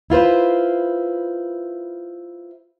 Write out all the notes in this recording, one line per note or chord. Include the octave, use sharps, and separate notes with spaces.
E4 F4 B4 C5